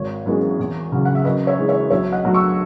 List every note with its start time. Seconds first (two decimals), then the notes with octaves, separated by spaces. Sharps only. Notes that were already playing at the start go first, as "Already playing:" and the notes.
Already playing: G#1 C#5
0.26 F#2 E3 G#3 B3
0.59 E2
0.92 C#3 F#3
1.05 F#5
1.15 E5
1.24 F#2 B4 D#5
1.47 C#5 E5
1.58 E3 G#3
1.68 C#5 E5
1.91 B1 C#5 E5
2.12 D#5 F#5
2.24 B2 F#3 A3
2.34 C#6 E6